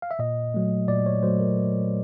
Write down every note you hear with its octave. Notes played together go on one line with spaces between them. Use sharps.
F5
E5
A#2 D#5
F#3 A3
A#2 D5
C#5
F#3 A3 C5
A#4